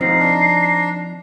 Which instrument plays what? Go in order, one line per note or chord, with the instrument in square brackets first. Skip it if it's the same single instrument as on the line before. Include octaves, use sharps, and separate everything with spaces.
[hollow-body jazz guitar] F3 C4 D#4 [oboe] A#5 [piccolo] C7
[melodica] D4